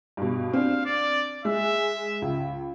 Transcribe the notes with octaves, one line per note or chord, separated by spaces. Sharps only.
G2 B2
C4 D4 F5
D5
G#3 E5
C#2